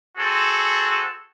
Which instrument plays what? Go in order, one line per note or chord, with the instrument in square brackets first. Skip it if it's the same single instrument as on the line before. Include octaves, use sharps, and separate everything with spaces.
[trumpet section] C4 F#4 G#4 A4